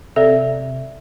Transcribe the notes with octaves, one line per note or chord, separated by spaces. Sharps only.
C3 A4 D5 E5